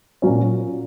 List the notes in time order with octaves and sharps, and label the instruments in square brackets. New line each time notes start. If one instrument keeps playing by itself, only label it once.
[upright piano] A#2 F#3 C#4